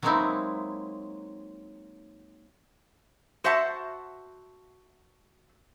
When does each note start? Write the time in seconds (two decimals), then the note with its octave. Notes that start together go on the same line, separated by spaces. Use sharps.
0.03 F#3 G#3 A#3 C4 D#4 E4
3.44 F#4 C5 E5 F#5 A5